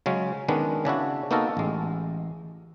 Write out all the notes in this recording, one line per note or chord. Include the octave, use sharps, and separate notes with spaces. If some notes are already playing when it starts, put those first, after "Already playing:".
C#3 F#3 G#3 C#4
D#3 G#3 B3 C#4 D4 B4
C#3 D4 E4 F#4
A#3 B3 D#4 F#4 A4 A#4
A1 G#3